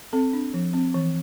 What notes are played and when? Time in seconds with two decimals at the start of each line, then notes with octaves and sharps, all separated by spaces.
0.13 C4 A4
0.33 D4
0.54 F3
0.73 C4
0.94 E3